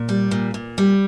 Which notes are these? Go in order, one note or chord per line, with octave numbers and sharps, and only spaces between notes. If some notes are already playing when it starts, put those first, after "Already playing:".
Already playing: A#2
G3
A#2
A#2
G3